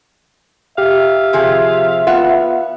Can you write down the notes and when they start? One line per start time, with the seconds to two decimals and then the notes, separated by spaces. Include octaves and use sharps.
0.78 G4 E5 F5
1.33 C3 F3 G#4
2.07 B3 F4 E5 F#5